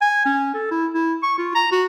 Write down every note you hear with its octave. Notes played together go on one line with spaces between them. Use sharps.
G#5
C#4
A4
E4
E4
C#6
F4
A#5
F#4